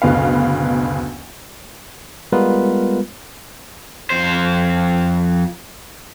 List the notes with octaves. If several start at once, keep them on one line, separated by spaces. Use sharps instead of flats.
F#1 D2 B2 B4 F5
G3 G#3 B3 F4 A#4 B4
F2 C5